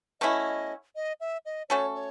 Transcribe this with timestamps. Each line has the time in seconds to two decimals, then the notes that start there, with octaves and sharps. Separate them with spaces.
0.21 B2 A3 C#4 E4 D#5
0.96 D#5
1.20 E5
1.45 D#5
1.69 A3 C#4 F#4 A4 C#5
1.94 C#5